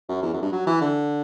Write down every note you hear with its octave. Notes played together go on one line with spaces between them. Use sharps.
F#2
E2
F#2
G2
F#3
E3
D3